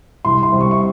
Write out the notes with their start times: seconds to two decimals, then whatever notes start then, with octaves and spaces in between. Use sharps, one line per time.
0.25 C2 C6
0.43 C6
0.52 C3 G3
0.61 C#6
0.71 C#6